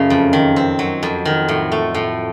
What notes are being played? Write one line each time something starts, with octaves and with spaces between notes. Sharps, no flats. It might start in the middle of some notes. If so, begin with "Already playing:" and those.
Already playing: F#2 C#3 A3 D#4
F2
D#3
C4
F#3
F2
D#3
A2
A3
A2